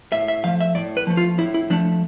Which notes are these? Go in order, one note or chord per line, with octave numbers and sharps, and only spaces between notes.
A2 E5
E5
F3 A3 F5
E5
A2 D5
B4
F3 A3
F4
A2 E4
E4
F3 A3 D4